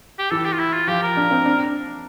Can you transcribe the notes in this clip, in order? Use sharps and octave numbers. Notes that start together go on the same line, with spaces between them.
G4
E3 A4
G4
F4
E4
F4
F3 G4
A#4
D4
C4
D4